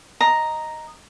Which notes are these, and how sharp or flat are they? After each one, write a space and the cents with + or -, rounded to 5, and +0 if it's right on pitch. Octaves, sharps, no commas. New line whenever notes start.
D#5 +0 A#5 +0